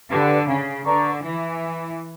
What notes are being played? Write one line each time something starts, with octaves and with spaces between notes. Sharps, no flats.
D3 G4 B4 D5
C#3
D3 B4 D5 A#5 C#6
E3